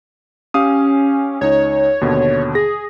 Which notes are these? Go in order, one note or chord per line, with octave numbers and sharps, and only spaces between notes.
C#4 G4 F5 D#6
C#2 D#4 C#5
D#2 B2 D3
G#4 A#6